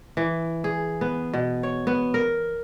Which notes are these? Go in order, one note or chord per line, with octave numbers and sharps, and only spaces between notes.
E3
G#4
B3
B2
C#5
B3
A#4